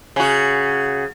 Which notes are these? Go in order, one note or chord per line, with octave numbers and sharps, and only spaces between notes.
C#3 F#4